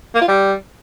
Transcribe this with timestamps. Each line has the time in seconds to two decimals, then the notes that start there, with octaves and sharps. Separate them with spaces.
0.15 A#3
0.21 F4
0.28 G3